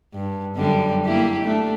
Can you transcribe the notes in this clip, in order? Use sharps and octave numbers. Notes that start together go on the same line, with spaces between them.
G2
F#2 D3 G3
A#3 E4 G4
A3 D4